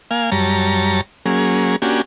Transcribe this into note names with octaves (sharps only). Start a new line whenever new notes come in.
A#3 F5 G#5
F#2 G3 C#5 A5 A#5
F#3 A#3 C#4 G#4
A#3 C#4 D4 F#4 G4 G#5